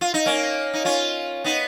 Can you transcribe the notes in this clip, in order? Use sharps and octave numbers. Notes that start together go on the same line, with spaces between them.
F4
D#4
A#3 C#4
D#4
C#4 F4
B3 D#4